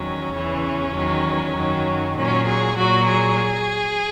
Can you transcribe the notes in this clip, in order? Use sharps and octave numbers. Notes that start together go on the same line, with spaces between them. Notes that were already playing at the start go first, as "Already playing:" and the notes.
Already playing: E2 D#3 F#3 C#4
E2 C#3 E3
E2 D#3 F#3
F#2 D#3 F#3
A#2 F#3 C#4
G#4
A#2 F#3 F#4
G#4